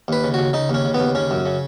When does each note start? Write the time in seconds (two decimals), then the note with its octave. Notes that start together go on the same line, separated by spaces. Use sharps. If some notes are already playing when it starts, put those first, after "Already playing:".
0.08 D#2 B4
0.24 C#3
0.34 C#3 F#4
0.53 C#3 D#4
0.70 D#2 C#4
0.85 C#3
0.94 B3
1.00 D#2
1.15 C#3 C#4
1.31 F#2
1.46 C#3